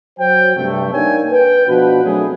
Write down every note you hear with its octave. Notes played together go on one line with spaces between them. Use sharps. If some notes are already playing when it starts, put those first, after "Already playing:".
F#3 C5 G5
G2 C3 A3
A#3 D4 D#4 C#5 G5 G#5
B4 G5
B2 F3 D4 F#4 B4
F#3 A3 C4 D4 G#4